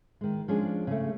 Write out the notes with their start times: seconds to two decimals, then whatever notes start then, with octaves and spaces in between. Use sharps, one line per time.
0.21 D#3 G#3
0.48 F3 G#3 C#4 D4 G#4
0.87 C#3 A3